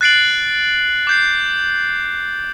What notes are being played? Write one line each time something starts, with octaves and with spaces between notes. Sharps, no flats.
F#6 A6 C7 D7 F#7
D6 G6 C7